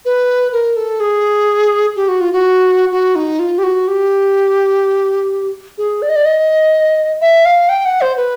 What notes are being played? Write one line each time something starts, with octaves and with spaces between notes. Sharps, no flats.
B4
A#4
A4
G#4
G4
F#4
F4
F#4
F#4
D#4
F4
G4
F#4
G4
G#4
D5
D#5
D5
D#5
E5
F5
G5
F#5
C5
B4